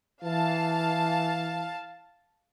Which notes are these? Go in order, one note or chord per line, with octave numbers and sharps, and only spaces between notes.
E3 F5 A5